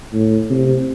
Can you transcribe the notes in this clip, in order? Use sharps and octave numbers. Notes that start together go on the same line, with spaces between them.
A2
C3